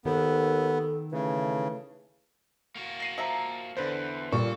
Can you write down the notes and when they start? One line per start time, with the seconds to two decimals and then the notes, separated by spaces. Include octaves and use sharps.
0.05 D#2 D#3 B3 A4
1.12 C#3 E3 A3
2.75 A#3 F#4
3.00 A#6 C7 D#7
3.18 F3 E5 A#5
3.77 E2 D3 B4 C5
4.32 A#2 G3 A4 C#6